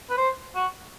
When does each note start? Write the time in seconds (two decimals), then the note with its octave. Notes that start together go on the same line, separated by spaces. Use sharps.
0.10 B4
0.17 C5
0.55 F#4